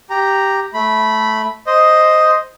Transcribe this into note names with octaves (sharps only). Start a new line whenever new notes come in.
G4 A#5
A3 B5
C5 D#5